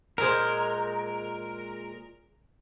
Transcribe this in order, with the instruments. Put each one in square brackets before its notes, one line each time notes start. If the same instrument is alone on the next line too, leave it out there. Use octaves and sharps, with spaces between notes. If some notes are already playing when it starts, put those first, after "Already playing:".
[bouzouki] A#2 G#3 C5 [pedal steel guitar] A#4